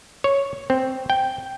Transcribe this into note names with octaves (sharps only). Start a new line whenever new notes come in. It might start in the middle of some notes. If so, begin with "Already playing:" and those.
C#5
C4
G5